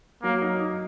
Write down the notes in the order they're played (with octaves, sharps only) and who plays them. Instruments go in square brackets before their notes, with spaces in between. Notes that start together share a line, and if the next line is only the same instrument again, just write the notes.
[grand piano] F#3 [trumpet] A#3
[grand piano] D#4
D#4